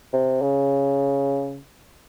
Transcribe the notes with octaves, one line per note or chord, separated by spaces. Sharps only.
C3
C#3